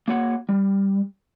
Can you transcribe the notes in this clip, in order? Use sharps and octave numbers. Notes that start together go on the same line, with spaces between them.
A#3 F#4 C#5 F#5
G3